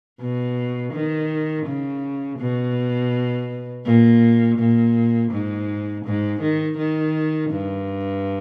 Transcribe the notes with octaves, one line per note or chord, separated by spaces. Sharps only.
B2
D#3
C#3
B2
A#2
A#2
G#2
G#2
D#3
D#3
G2